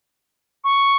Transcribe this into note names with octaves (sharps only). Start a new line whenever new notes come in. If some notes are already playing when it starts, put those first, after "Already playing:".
C#6